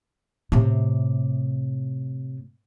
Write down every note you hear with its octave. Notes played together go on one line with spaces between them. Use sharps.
A2 C3